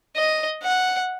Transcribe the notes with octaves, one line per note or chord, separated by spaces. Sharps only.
D#5
F#5